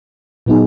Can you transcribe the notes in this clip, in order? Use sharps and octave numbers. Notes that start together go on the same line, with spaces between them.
A#2 F#3 B3 D#4 G#4